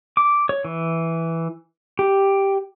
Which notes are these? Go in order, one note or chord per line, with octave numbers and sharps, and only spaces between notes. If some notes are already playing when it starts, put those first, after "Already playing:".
D6
C#5
E3
G4